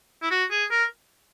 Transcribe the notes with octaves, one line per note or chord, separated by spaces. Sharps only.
E4
F#4
G#4
A#4